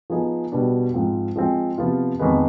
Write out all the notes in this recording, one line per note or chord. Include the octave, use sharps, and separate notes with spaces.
F3 B3 D#4 G#4
B2 G3 B3 D4
G#2 F3 C4
F3 G#3 C4
C3 F3 B3 F4
F2 D#3 G#3 B3